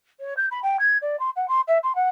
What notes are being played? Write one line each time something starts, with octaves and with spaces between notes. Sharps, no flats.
C#5
G6
B5
G5
G#6
D5
C6
F#5
C6
E5
C6
F#5